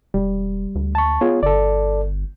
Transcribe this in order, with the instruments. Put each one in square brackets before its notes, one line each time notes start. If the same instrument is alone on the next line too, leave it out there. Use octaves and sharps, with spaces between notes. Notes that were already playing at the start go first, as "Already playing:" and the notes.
[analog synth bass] E1 [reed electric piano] G3
[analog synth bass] D2
[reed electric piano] A5 C#6
[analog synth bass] B3 [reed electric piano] F4 G#4 C#5
[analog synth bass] G1 [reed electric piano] A4 D5